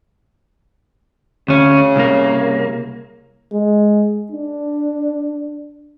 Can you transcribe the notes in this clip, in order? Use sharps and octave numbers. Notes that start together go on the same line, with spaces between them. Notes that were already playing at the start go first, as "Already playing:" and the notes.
D2 C#3 C#4
C2 A#3
G#3
D4